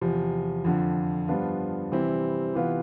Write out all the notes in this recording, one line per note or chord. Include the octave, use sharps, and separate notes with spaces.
E2 C3 F3
F2 D3 F3
G2 F3 B3 D4 F4
C3 E3 G3 C4 E4
C3 E3 B3 F4